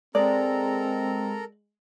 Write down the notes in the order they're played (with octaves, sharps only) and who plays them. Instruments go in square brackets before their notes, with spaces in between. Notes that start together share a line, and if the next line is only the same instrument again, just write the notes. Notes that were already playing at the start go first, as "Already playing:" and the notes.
[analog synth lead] G#3 [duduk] C4 [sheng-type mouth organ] A4 A#4 A#5 [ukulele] D5